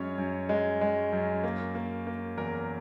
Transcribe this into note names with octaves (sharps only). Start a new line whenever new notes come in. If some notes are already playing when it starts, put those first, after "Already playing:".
Already playing: F#2 G#3 C#4 C#5
F#2
G#3
G#3
F#2
A#3
A#3
A#3
E2 A#4